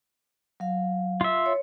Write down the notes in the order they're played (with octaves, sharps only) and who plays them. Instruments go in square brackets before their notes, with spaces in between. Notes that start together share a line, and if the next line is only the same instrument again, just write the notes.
[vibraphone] F#3 F5
[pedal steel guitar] F4 E5
[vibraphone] C#5